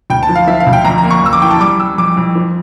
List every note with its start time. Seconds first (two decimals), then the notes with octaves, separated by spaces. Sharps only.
0.10 D2 G5
0.23 A5
0.29 F3
0.35 F5
0.47 F3 E5
0.60 F5
0.67 D2
0.73 G5
0.85 F2 A#5
0.98 A#5
1.04 A#3
1.11 C#6
1.22 F2 E6
1.33 D6
1.42 E3 G5
1.51 A5
1.60 G3 D6
1.79 G3 E6
1.98 F2 D6
2.17 F2
2.35 F3